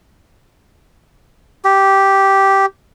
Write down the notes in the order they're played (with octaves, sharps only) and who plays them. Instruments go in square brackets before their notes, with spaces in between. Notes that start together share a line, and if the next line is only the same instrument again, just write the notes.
[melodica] G4